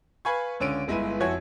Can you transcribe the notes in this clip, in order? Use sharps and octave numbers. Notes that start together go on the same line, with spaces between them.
B4 F5 G#5 B5 C#6 G#6
C#2 D3 C#4 D7 D#7
G1 G#3 E4 B4 D#7
F2 E4 F#4 C#5 G#5 G#6